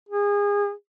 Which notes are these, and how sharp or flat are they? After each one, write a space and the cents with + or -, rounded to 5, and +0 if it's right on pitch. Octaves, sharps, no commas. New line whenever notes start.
G#4 -30